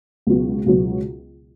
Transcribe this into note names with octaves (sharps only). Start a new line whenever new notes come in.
C#2 B2 F#3 B3 F#4
C#2 B2 F#3 B3 F#4